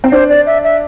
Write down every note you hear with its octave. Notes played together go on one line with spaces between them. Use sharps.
C4
D4 C5
D5
E5
E5